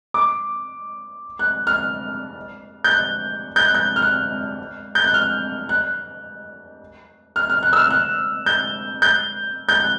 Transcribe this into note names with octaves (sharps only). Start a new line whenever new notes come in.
D6
F#6
F6
G6
F#6
G6
F#6
G6
F6
F#6
G6
F#6
F6
F#6
F6
F6
F#6
E6
F6
F#6
G6
G6
G6
F#6